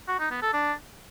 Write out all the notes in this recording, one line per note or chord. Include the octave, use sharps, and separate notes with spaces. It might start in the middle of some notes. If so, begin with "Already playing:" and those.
F#4
D#4
B3
A4
D4